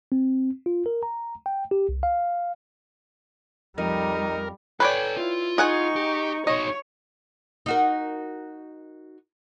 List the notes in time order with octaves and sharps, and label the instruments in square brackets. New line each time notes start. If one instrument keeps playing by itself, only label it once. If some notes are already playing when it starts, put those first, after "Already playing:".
[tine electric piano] C4
F4
A#4
A#5
G5
G4
C2
F5
[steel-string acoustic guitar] F2 [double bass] G3 [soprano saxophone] D#4 [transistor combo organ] A#4
[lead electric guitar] A4 G#5 [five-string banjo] B4 C#5 D5 [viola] G5
[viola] E4 [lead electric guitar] F4
[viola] D#4 C#6 [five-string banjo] G#4 F#5 G#5
[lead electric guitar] G4
[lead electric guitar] D#4 F#4 [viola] C#5 [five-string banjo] D#5
[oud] D#4 F#4 A#4